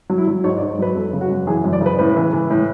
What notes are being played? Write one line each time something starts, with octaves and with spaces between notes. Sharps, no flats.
F#3
E4
F#3
G#2 C#5
D5
G#2
C#5
F#3 B4
F#2 A4
C#3
F#4
F#2
E3 G#4
F#2
D5
C#3 B4
A2 B4
E3
E3
A2